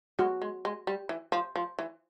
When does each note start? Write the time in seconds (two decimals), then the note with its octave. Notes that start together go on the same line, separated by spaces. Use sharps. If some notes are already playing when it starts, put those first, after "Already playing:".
0.19 G#3 F#4
0.42 G#3
0.65 G#3
0.87 G3
1.09 E3
1.32 F3
1.56 F3
1.79 E3